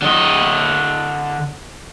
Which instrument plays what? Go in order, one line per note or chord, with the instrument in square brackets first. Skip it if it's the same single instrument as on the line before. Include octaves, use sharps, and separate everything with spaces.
[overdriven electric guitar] D3 D#5